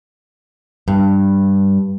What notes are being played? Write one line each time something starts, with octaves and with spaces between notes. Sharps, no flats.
G2